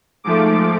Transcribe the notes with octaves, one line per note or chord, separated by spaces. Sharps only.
G#2 F3 A3 D6